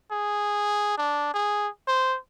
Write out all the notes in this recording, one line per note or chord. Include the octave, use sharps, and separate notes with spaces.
G#4
D4
G#4
C5